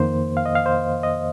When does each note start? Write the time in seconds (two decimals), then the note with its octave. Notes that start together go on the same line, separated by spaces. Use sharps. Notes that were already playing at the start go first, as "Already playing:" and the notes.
Already playing: F2 D#3 A#3 C5
0.37 F5
0.46 D#5
0.55 F5
0.66 C5
1.03 D#5